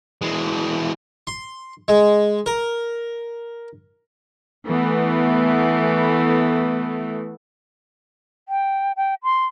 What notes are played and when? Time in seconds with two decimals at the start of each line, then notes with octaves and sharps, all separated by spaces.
0.22 E3 G#3
1.27 C6
1.88 G#3
2.46 A#4
4.66 E3 A3 B3
8.49 G5
8.97 G5
9.23 C6